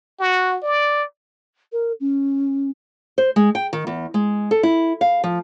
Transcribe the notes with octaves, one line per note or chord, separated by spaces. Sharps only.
F#4
D5
A#4
C#4
C5
G#3
G5
D#3
E2
G#3
A4
E4
F5
F3